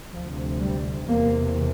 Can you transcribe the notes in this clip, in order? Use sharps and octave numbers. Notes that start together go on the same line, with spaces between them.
D2 C3 F3
G3
E2 C3 A#3